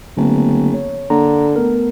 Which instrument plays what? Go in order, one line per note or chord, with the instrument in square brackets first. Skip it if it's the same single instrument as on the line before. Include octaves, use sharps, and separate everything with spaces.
[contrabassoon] F#1 [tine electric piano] D3 A3 B3
[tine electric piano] C#5
[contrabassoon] D3 [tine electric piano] A#3 A#5
[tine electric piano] A3 B3 A#4